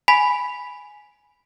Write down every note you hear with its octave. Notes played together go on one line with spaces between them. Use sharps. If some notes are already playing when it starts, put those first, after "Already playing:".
G#5 B5 B6